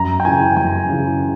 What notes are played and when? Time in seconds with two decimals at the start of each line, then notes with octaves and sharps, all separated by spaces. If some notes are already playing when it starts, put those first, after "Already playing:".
Already playing: F#2 A#5
0.20 G5
0.25 C#3 E3 G#5
0.57 F#2 G#5
0.89 C#3 E3